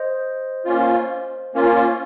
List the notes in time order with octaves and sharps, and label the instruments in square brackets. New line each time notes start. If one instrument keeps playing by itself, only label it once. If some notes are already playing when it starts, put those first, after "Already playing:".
Already playing: [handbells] C5 D#5
[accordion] A#3 C#4 F4
A#3 C#4 F4